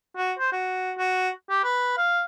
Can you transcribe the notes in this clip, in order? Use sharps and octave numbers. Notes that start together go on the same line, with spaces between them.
F#4
C5
F#4
F#4
G4
B4
F5